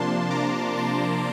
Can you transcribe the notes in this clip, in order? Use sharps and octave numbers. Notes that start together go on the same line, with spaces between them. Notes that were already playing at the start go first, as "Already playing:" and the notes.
Already playing: C3 F3 A#3 D4 A5 C6
A#5 D6
A5 C6